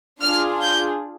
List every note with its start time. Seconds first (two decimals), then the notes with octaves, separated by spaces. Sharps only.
0.21 D4 F4 G#4 F6
0.61 G6